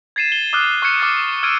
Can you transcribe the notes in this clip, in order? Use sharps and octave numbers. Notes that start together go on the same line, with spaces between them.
G#6 A6 C7 D#7 E7
G7
D6 D#6 F6 F#6 G7
C#6 F6 F#6 G#6 C#7 E7
D6 F6 A6
E6 F6 G#6 D7 D#7